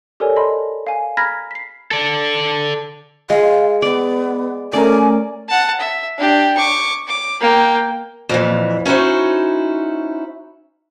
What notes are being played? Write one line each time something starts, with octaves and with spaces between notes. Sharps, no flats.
G4 A4 A#4 C#5 D5 G#5
D#5 A5 B5 C6
F5 G#5
A#5 B5 F6 G#6 A#6 B6
B6 C7
A4 D5
G#3 F5
B3 D5
A3 C#4 A#4 D5 G#5
F#5 A5
E5
D4 G4
C#6 D6
D6
A#3 G5
F2 A#2 E3
C#4 D#4 E4 F#4 C5